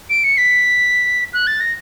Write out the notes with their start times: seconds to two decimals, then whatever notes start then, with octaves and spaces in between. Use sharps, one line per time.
0.10 D7
0.24 C#7
0.38 B6
1.33 F#6
1.47 A6
1.60 A#6